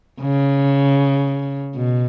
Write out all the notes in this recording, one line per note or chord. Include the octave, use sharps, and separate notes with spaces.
C#3
B2